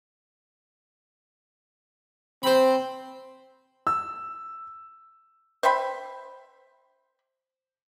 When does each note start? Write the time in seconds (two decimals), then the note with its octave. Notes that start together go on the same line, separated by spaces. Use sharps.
2.43 C4 C5 B5
3.87 E6
5.63 C5 E5 G5 B5